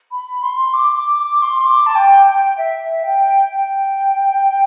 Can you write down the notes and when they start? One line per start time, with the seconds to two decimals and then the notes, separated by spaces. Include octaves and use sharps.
0.12 B5
0.43 C6
0.74 D6
0.96 D6
1.19 D6
1.42 C6
1.66 D6
1.86 A5
1.95 G5
2.26 G5
2.58 E5
3.04 G5
3.49 G5